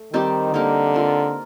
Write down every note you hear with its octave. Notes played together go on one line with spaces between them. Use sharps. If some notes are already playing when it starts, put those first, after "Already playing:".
Already playing: A3
D#3 G3 C4 D#4 G4
D3 A#3 D#4 G4 A#4
C4 F4 A#4